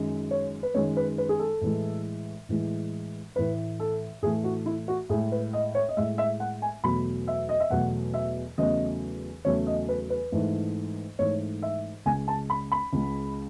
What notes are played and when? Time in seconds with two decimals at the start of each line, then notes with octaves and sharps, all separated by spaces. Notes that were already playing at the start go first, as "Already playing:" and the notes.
Already playing: F#2 D#3 G#3
0.31 C#5
0.63 B4
0.74 F#2 D#3 G#3 C#5
0.97 B4
1.18 B4
1.29 G#4
1.39 A4
1.61 A2 E3 G#3
2.49 A2 E3 G#3
3.36 A2 E3 A3 B4
3.80 A4
4.22 A2 E3 A3 G#4
4.44 F#4
4.66 E4
4.88 F#4
5.09 A2 G#4
5.13 G#3
5.32 B4
5.53 D#5
5.75 C#5
5.89 D#5
5.97 A2 G#3 E5
6.18 E5
6.40 F#5
6.62 G#5
6.84 E2 B2 F#3 A3 B5
7.28 E5
7.49 D#5
7.60 E5
7.70 E2 B2 F#3 A3 F#5
8.14 E5
8.58 E2 C#3 F#3 A3 D#5
9.45 E2 C#3 F#3 A3 C#5
9.67 D#5
9.89 B4
10.10 B4
10.32 G#2 E3 A3
11.19 G#2 E3 A3 C#5
11.62 E5
12.06 C#2 C#3 G#3 G#5
12.28 A5
12.50 B5
12.72 B5
12.93 C#2 C#3 G#3